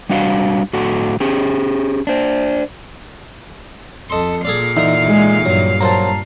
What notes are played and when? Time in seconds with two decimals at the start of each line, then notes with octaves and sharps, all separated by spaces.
0.09 G3 D4 F#4 F5
0.73 A2 F#4 A4
1.20 C#4 G4 G#4
2.07 D4 C5
4.10 F2 A4 D#5 C6
4.45 A#2 G#4 A4 D5 F5
4.77 D3 E3 D#4 E5 D#6
5.07 G#3
5.45 G2 F#3
5.81 F#3 A#3 C5 A5 A#5